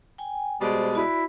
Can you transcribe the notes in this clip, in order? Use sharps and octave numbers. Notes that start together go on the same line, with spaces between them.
G5 G#5
B2 G3 G#3 C5 D5
E4 F#4 D5